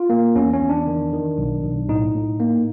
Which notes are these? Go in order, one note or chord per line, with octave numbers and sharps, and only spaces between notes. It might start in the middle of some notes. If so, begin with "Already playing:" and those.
Already playing: F4
A#3
E2 C#4
C#4
E2
D4
D#3
D#3
B1
B1
A2 D#4
A2
A#3